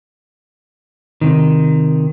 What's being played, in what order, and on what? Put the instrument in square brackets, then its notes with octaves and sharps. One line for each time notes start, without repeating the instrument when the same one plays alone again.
[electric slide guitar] C3 D#3